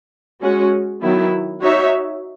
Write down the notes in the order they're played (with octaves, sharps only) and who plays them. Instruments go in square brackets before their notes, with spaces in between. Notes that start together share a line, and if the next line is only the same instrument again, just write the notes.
[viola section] G#3 C#4 F#4
D#3 F#3 B3 E4
D#4 F#4 C#5 E5